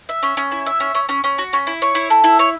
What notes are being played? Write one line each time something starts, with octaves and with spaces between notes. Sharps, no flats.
E5
C#4
C#4
E4
E5
C#4
C#4
C#4
C#4
F#4
C#4
E4
C#5
E4
A4
E4
C#5